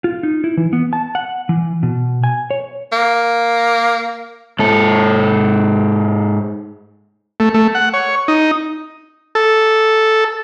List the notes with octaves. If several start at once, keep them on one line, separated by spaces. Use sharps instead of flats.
F4
D#4
E4
E3
B3
A5
F#5
E3
B2
G#5
C#5
A#3
G#2 A4
A3
A3
F#5
C#5
D#4
A4